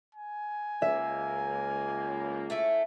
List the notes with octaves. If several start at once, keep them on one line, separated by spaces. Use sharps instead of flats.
G#5
C#2 A#3 E5
A3 C#4 E4